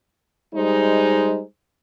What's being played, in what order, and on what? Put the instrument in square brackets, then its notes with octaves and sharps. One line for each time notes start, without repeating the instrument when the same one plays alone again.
[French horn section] G3 G#3 D#4 C5